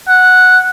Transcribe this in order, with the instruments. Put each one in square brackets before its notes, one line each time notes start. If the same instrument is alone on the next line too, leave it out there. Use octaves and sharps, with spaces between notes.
[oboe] F#5